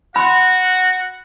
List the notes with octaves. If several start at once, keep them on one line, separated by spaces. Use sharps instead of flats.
F#4 F#5 B5 C6